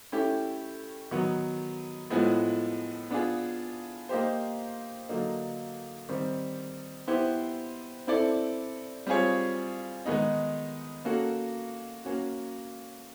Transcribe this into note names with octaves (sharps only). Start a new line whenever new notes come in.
A3 C#4 E4 G4
D#3 F#3 B3
A2 F3 G#3 B3
B3 D4 F4 G#4
A#3 D#4 G4 C5
D3 F#3 A#3 D#4
D#3 G3 C4
B3 E4 G4 C5
C4 E4 A4 D5
G3 C4 F4 G#4 C#5
D#3 G#3 B3 D#4
A#3 C#4 F#4 A4
A#3 C#4 F#4